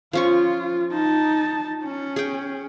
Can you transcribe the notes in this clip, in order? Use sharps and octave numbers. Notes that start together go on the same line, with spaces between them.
F3 C#4 F4 C#6
D#4 A5
C#4
G#4 G5